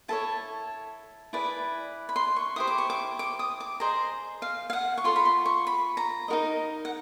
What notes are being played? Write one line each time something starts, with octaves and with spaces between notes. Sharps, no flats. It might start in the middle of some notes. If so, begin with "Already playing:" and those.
E4 A4 C#5 A5
E4 G#4 B4 D5
B5
C6
C#6
E4 G4 C5 D#6
D6
C#6
D6
D6
D#6
D6
G#4 C5 D#5 A#5
F5
F5
F#5
C#6
F4 A4 C#5 C6
B5
C6
C#6
B5
A#5
D#4 F#4 A#4 D#5
F#5